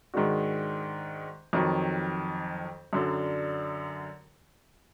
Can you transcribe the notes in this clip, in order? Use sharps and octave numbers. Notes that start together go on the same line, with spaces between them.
G#2 D#3 G#3 D4 F#4
F2 D#3 F#3
F#2 D3 F#3 D4